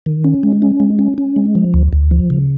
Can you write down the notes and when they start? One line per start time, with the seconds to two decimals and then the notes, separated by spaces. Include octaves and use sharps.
0.06 D#3
0.24 C#4
0.43 G#3
0.62 C#4
0.80 G#3
0.99 C#4
1.18 C#4
1.36 G#3
1.55 F3
1.74 D2
1.93 D2
2.11 F3
2.30 C#3